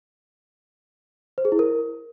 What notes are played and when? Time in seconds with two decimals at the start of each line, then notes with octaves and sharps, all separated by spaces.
1.38 C5
1.45 G#4
1.52 E4
1.59 A#4